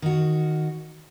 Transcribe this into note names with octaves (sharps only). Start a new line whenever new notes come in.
D#3 F#4